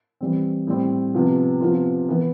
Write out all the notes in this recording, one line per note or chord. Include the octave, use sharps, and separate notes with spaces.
E3 G3 C4
A2 G3 C4
C3 F3 B3
C3 F3 B3 F4
E3 B3 E4